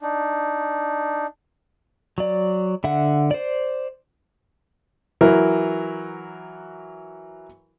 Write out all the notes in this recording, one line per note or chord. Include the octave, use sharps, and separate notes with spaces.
D4 D#4
F#3 D5
D3 E5 F#5
C5 D5
E3 F#3 E4 A#4